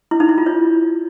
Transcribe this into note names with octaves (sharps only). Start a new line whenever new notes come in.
E4
D#4
E4
F4
C#5